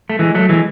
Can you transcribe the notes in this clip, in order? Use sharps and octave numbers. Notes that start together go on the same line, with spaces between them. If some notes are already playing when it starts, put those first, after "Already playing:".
A3
E3 G#3
F#3 A3
E3 G#3